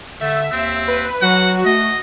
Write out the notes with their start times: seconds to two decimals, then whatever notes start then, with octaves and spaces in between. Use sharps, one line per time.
0.21 D3 A3 E5
0.52 D#2 C4
0.88 B4
1.22 F#3 F#4 F#5
1.65 A3 D#5